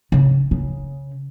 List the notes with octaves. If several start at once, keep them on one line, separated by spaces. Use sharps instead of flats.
C#3
C#3